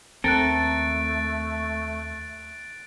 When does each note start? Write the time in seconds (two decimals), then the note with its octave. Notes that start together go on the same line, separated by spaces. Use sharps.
0.24 D#2 A3 C4 A4 A#4 F#6 A6 D7